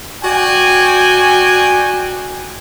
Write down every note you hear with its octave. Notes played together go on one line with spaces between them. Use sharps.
F#4 D5 G5 G#5